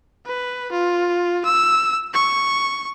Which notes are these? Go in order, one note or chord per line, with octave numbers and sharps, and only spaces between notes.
B4
F4
E6
C#6